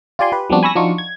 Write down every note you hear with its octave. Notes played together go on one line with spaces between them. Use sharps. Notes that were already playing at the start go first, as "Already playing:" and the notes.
F4 G4 D5 G#5 C6
G4 B4
F3 G3 B3 C4 D4 F#4
G#5 B5 C#6 E6 A#6
F3 D4 D#4 F4 F#4 C#6
G#6